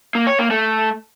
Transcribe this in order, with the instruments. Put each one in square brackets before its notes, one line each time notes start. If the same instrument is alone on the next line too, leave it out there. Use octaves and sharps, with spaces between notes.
[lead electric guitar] A#3
C#5
A#3
A3